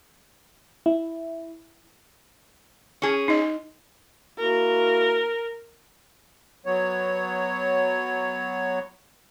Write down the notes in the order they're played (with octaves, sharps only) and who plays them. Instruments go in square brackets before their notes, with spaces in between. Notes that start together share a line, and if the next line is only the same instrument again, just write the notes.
[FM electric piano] E4
[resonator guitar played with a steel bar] C#4 G#4
[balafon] D#4 D#5
[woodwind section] A#3 E4 F#4 [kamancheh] A#4
[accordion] F#3 B3 C#5